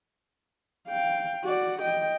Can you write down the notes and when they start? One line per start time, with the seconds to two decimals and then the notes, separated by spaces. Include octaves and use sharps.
0.88 F5 G5
1.44 F#4 D5
1.81 D#5 G5